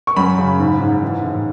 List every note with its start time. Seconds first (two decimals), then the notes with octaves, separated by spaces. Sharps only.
0.07 C#6
0.17 F#2 B5
0.38 C#3
0.59 G#2
0.80 G#2
1.02 E3
1.23 A2